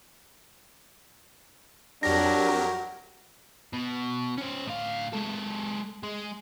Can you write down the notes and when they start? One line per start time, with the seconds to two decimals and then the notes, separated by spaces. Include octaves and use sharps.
2.03 F2 F#3 D4 G4 A#4 A#6
3.73 B2
4.38 C#4 C5
4.67 A2 F5
5.13 G#3 A4
6.03 G#3